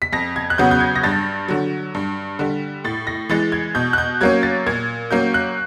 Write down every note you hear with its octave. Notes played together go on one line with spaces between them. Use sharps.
B6
F2 A#6
G#6
F#6
C#3 F#3 B3 G6
G6
G#6
A#6
G2 A6
D3 F#3
G2
D3 G3
A2 A6
A#6
E3 G#3 A6
G#6
B2 G6
F#6
G6
F#3 A#3 C#4 G#6
A6
A#2 G#6
F#3 A#3 C#4 G6
F#6